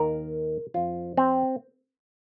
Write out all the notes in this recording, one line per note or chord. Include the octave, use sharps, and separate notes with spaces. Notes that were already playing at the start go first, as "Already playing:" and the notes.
Already playing: D#2 D#3 A#4
F2 F3 F4
C4